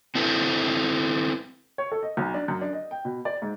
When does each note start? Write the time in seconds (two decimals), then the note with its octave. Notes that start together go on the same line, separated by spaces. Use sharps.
0.15 C4 E4 A4 B4 C5
1.78 C#5
1.92 A4
2.03 D#5
2.17 B1
2.34 D4
2.48 F#2
2.61 D4
2.73 D#5
2.91 G5
3.05 B2
3.25 D5
3.42 G#2